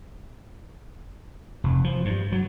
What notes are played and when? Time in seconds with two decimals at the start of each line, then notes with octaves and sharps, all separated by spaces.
1.64 F1
1.84 F3
2.05 G2
2.32 F#3